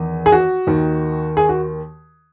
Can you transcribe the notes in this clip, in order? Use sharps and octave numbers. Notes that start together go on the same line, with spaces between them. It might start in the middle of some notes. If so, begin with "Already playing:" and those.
Already playing: E2 D#3
G#4
F#4
D#2 D#3
G#4
F#4